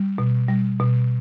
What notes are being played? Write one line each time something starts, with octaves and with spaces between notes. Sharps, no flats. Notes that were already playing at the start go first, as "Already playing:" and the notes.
Already playing: G3
B2
G3
B2